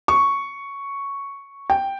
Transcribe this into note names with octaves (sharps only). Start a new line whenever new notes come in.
C#6
G5